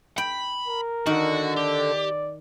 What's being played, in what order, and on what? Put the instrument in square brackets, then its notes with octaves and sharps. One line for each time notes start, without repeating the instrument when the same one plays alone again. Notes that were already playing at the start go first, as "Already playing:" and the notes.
[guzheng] G5 [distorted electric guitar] B5
[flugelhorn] A#4
[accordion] D3 [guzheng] D#3 [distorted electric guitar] F#4
[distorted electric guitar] G4 [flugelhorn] D5